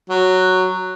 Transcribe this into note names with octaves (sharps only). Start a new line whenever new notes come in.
F#3